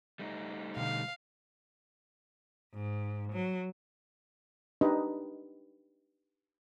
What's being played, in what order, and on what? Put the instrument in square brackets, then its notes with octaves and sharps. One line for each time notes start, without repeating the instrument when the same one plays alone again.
[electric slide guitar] G3 A3 D#4
[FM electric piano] B2 D3 [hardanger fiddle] F5
[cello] G#2
F#3
[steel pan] D4 D#4 G4 B4 D#5